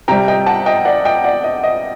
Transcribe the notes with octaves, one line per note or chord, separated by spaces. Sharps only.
C3 G3 G5 A#5
D#5 G5
F#5 A5
D#5 G5
D5 F#5
D#5 G5
D5 F#5
D#5
D#5